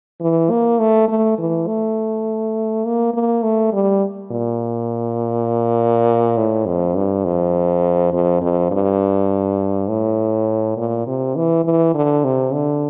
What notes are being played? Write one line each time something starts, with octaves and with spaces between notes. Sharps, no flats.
E3
A#3
A3
A3
E3
A3
A#3
A#3
A3
G3
A#2
A2
F2
G2
F2
F2
F2
G2
A2
A#2
C3
E3
E3
D3
C3
D3